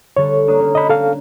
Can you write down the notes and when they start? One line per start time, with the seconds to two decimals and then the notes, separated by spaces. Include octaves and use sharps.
0.17 D3 G3 A4 C#5
0.47 A#3 D4 D#6
0.59 C#4
0.75 D4 D#5 B5
0.89 A4 F5